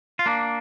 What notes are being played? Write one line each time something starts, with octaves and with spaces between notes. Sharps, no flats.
F4
A#3 D4